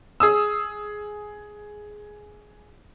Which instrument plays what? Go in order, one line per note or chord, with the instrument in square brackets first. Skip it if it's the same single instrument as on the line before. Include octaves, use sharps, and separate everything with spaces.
[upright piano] G#4 D#6 E6